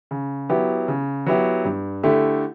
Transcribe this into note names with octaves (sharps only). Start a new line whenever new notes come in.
C#3
F#3 B3 E4 G4
C#3
F#3 B3 E4 G4
G2
D3 A3 E4 G4